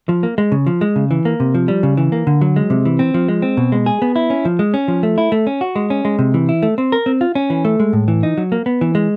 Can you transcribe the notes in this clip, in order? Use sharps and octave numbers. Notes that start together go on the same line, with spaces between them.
F3
A#3
G#3
C#3
F3
G#3
C#3
E3
A#3
C3
F3
G3
C#3
E3
A#3
D3
F#3
G#3
C3
E3
C4
F3
G#3
C4
B2
G#3
G#4
B3
E4
C#4
F3
G#3
C#4
F3
A3
E4
A3
C#4
F#4
G#3
C#4
G#3
C3
E3
E4
A3
C4
A#4
C4
F4
C#4
E3
A3
G#3
A2
E3
D#4
F#3
A#3
B3
E3
G#3